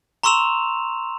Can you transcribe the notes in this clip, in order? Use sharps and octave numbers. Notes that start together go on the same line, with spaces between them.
A#5 C6 C#6 E6 E7 F7